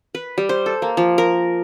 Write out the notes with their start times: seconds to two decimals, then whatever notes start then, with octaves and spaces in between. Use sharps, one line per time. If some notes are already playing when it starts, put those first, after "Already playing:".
0.15 B4
0.38 G3
0.49 C5
0.66 A4
0.82 A#3
0.97 F3
1.18 A#4